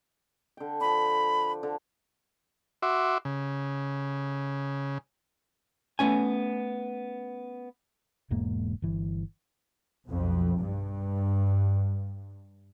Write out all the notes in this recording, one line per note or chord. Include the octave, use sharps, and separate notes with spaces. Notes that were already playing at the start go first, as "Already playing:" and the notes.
D3 G5
F3 D4 B5
D3
F#4 E5 C6 D6
C#3
A3 B3 C#4 G#5
E1 E2 G#2 A#3
G1 E3
B1 F2
G2